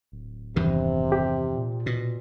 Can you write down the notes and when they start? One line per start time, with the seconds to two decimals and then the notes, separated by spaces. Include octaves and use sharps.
0.12 D1
0.56 E2 G2 C3 D#3
1.12 G4
1.55 A#2
1.86 B2